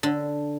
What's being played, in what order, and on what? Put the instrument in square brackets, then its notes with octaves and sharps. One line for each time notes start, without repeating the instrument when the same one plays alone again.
[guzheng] D3